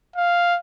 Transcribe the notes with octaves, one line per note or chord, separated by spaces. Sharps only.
F5